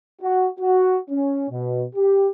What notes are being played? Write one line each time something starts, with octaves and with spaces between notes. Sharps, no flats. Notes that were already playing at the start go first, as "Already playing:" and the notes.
F#4
F#4
C#4
B2
G4